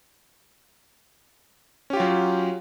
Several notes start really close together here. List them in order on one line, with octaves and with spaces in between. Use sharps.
C#4 G4 F4 F#3